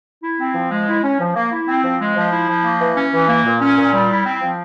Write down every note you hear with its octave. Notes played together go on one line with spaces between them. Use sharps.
E4
C4
F3
G#3
E4
C#4
F3
A#3
E4
C4
F3
G#3
F3
E4
F3
A#3
E3
C#4
E3
A#3
A#2
C#4
A#2
G3
E4
C4
F3